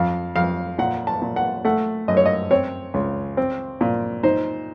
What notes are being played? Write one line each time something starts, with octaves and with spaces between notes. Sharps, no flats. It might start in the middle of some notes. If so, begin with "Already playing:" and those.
Already playing: F2 F5
F2 F5
A#2 F#5
A5
A#2
F#5
A3 F#5
F#2 D#5
C#5
D#5
C4 C#5
C#2
C4
A#2
D#4 C5